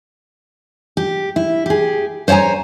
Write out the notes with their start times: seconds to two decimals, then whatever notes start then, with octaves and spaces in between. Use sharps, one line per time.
0.97 G4
1.36 E4
1.66 G4 G#4
2.28 C5 C#5 F#5 G#5 A#5